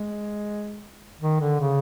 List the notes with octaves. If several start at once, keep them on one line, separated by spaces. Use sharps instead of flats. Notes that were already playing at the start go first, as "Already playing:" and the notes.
Already playing: G#3
D#3
D3
C#3